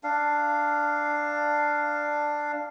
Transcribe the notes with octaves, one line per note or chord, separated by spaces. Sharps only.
D4 F5